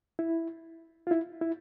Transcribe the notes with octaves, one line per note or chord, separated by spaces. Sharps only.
E4
F4
E4
E4